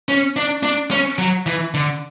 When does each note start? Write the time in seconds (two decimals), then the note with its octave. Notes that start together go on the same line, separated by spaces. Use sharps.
0.09 C#4
0.36 D4
0.63 D4
0.91 C#4
1.18 F#3
1.46 E3
1.74 D3